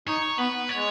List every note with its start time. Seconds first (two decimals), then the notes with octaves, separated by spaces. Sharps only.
0.08 D#4 C#5
0.38 B3 B4
0.69 G#3 C#5